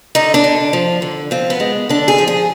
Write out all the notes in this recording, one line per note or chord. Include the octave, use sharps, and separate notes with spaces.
D3 D#4
D4
D3
F3
D3
F3 C4
B3
G#3
D3 D4
G#4
F3
G#4